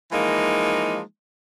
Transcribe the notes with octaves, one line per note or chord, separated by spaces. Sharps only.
E3 F3 G#3 A#3 D#4